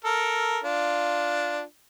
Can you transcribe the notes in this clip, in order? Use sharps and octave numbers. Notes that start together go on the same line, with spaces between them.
A4 A#4
D4 F4